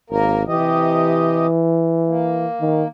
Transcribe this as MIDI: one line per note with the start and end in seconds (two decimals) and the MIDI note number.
0.10 0.43 32
0.10 0.43 58
0.10 0.43 70
0.48 1.47 48
0.48 2.46 52
0.48 1.47 67
0.48 1.47 75
2.06 2.88 58
2.60 2.84 51